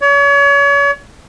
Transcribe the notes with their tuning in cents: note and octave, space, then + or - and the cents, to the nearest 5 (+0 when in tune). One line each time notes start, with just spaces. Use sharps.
C#5 +35